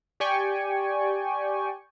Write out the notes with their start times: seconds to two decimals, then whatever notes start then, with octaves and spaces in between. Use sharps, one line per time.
0.20 G4 D5 G5 G#5 C#6